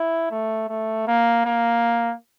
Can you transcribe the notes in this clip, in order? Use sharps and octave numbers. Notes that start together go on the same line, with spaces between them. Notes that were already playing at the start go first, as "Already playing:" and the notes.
Already playing: E4
A3
A3
A#3
A#3